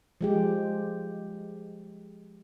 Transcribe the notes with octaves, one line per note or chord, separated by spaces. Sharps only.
F3 G#3 G4